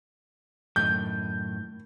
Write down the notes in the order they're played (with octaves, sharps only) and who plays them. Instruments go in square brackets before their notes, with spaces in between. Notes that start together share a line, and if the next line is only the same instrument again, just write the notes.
[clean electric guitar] F#2 A2 D#3 [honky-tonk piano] G6